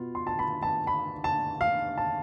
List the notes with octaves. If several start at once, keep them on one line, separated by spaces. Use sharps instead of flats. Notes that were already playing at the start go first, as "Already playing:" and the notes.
Already playing: B2 B3 F4
C6
A5
B5
A5
B5
A5
F5
A5